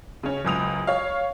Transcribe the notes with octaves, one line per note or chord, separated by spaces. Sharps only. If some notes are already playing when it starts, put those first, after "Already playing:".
C#3 C#4
F#1 C#2 D#6 F7
C#5 F5